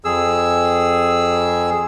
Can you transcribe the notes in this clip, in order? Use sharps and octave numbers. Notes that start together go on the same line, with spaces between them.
F2 G#4 E6